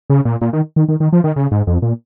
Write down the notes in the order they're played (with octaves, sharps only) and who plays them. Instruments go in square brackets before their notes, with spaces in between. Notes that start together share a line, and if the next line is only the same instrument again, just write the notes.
[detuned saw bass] C#3
A#2
A#2
D#3
D#3
D#3
D#3
F3
D#3
C#3
G#2
F2
A#2